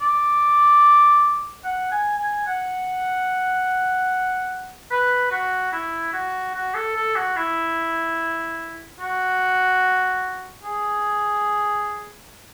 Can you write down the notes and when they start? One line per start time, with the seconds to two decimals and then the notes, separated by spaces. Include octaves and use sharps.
0.01 D5
1.64 F#5
1.91 G#5
2.18 G#5
2.47 F#5
4.91 B4
5.31 F#4
5.73 E4
6.13 F#4
6.55 F#4
6.74 A4
6.96 A4
7.15 F#4
7.36 E4
9.00 F#4
10.63 G#4